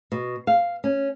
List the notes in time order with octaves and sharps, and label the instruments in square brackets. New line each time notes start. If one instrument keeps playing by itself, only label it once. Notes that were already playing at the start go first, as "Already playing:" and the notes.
[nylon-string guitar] B2
F5
C#4